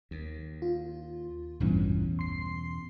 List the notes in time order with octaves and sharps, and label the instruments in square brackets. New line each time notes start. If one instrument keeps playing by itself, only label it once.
[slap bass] D#2
[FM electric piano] F4
[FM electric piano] A1 G2 E3 [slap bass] E2 B2 C#4
[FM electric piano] C6 C7